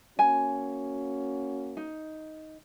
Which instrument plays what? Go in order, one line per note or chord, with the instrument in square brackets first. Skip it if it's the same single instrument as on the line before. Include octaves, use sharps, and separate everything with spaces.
[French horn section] A#3 C#4 F#4 [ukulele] G#5
[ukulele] D#4